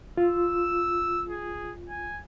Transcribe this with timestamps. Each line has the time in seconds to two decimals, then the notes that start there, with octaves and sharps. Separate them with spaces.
0.17 F4 E6
1.29 G#4
1.90 G#5